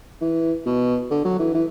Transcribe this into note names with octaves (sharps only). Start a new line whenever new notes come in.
E3
B2
D3
F#3
E3
E3